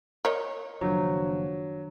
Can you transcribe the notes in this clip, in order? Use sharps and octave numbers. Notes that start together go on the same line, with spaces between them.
A#4 C#5 D#5
F#1 D#3 F3 F#3 D4